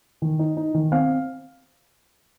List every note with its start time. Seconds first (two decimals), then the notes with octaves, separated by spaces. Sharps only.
0.22 D#3
0.39 D#4
0.57 D#4
0.74 D#3
0.92 C4 F5